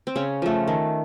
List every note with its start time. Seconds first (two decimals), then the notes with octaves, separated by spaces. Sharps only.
0.07 C4
0.16 C#3 C#4
0.42 F3 A3
0.68 D#3